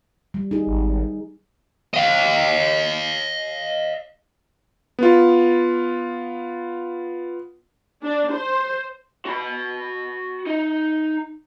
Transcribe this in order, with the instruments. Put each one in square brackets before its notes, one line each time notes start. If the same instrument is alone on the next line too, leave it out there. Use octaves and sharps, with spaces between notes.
[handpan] G3
D#4 G#4
[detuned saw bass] G#1
[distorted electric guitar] D#5 F5
[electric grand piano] B3 F4
[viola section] D4
C5
[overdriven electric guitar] F#4 B5
D#4